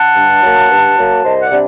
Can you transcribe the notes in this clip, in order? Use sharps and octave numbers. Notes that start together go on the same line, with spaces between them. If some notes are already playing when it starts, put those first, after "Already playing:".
Already playing: F#5 A5
G2
F#3 A#3
G2
F#3 A#3
C2 C5 D#5
D5 F#5
C3 G3 D4